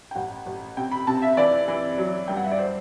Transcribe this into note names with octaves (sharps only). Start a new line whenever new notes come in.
G5
A1 F#5
A1
C3 G5
B5
C3 A5
E5
E3 D5
E3
F#3
G2 G5
F#5
E5
D5
C5